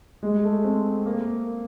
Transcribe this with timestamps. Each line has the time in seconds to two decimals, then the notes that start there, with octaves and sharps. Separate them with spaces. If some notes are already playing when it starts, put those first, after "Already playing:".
0.23 G#3
0.44 A3
0.64 C4
1.06 A#3